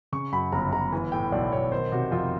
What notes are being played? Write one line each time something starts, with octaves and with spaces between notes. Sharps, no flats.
C#3 C#6
F#2 B5
G1 A#5
G1 A#5
E3 G#5
A2 G5
B1 D5
B1 C#5
D#3 C5
C3 F#4
F2 F4